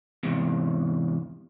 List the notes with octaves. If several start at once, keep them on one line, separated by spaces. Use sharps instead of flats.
E2 G#2 C3